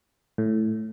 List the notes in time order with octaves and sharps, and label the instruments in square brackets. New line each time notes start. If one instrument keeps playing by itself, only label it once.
[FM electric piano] A2